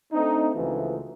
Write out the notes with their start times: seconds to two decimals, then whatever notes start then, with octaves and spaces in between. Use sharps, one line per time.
0.13 A3 C4 D4 D#4
0.56 C#2 E3 F3 A3 F#4